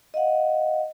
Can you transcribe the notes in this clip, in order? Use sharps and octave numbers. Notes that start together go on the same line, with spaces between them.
D#5 F5 F#5